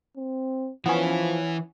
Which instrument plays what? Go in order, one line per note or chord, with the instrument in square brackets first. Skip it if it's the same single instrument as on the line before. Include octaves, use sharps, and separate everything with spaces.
[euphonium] C4
[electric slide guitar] E3 E4 [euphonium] F3 [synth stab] B3 C#4